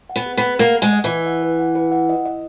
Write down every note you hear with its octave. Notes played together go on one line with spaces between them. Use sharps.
F#5
B3
G#4
B3 F#5
A#3 G#4
F#5
G#3
D#5
E3
B4
F#5
B4
F#5
B4
F#5
D#5
D#5